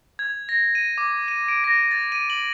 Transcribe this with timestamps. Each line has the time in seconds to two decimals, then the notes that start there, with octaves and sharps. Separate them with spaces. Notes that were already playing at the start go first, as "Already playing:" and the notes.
0.19 G#6
0.49 A#6
0.75 D#7
0.98 D6
1.28 D#7
1.48 D7
1.64 A#6
1.91 A6
2.12 D#7
2.30 F#7